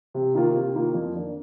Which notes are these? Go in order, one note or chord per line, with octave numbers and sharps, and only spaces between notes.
C3
D#3 A#3 F4
C3
D#3 A#3 F4
F2
D#3 A#3 D4